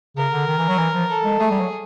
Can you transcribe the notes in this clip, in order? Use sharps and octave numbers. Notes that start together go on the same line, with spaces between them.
C#3 A#4
D3
D#3
E3
F#3
E3
F3
A4
G#3
A3 G#4
G3
F#3